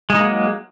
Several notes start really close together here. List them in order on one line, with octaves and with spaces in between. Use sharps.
G#3 D#4 A#3 F#3